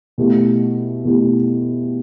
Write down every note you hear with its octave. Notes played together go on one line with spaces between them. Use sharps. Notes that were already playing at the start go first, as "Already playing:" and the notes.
B2 A3 E4 G4
B2 A3 E4 G4